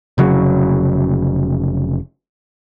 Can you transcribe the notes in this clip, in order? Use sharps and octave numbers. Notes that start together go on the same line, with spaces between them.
F1 C#3 F#3